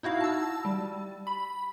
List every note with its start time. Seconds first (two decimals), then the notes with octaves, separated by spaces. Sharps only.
0.03 D#4 E4 F#4 F5
0.21 A5 E6
0.65 G3
1.27 B5